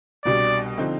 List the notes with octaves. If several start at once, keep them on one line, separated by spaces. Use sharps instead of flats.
C2 B2 G3 D4 D5
D3 F3 C4 D#4